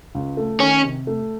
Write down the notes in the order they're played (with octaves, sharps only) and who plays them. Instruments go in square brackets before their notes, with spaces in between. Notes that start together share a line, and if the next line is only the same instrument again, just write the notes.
[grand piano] C#2
A3
[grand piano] D#3 [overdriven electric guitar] C#4
[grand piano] C3
A3